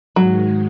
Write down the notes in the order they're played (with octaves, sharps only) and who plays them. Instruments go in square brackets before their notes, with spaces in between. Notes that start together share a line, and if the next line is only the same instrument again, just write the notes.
[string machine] G#2 D#3 G#3 [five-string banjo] F#3